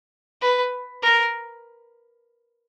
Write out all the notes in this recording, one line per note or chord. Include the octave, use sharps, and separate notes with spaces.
B4
A#4